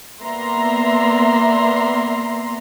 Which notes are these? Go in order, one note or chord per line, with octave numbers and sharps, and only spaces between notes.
A#3 B3 D5 E5 A#5 C6